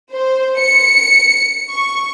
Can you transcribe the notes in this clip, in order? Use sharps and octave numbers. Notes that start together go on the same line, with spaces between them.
C5
C#7
C#6